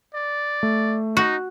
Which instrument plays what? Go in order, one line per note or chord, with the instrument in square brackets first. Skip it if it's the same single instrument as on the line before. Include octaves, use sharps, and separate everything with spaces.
[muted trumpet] D5
[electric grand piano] A3
[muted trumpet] D#4 [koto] F#4